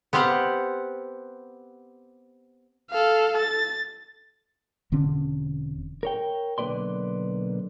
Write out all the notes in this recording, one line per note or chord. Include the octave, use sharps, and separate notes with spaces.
B3 C4 G4 F5 F#5
A4 F5
A6
E1 D3 C4 C#4
A#4 C#5 G5
B1 D3 A#3 B4 D5 C6